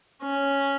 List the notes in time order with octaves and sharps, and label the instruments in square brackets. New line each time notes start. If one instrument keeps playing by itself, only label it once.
[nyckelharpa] C#4